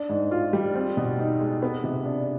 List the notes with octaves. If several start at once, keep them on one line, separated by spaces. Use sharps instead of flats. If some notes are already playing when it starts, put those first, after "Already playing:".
Already playing: D4
G#2
F4
G3
C4
B2
D#4
G#3
B3
C3
D4